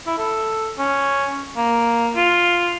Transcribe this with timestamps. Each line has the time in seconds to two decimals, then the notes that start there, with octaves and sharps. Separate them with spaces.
0.06 E4
0.18 A4
0.78 C#4
1.56 A#3
2.16 F4